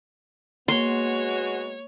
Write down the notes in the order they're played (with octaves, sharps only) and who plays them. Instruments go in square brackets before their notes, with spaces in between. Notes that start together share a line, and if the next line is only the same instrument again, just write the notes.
[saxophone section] G#3 B3 F#4 [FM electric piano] A#3 [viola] C#5 [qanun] C6